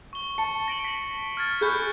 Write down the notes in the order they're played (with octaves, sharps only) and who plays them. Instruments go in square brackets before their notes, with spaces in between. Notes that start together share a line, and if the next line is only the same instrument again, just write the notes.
[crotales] C#6 G7
[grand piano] A5 [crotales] C#7
[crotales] A#6 D7 F#7
B6 F#7
F6 G#6 A6
[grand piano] G#4 B5 C#6 [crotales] F#6 G6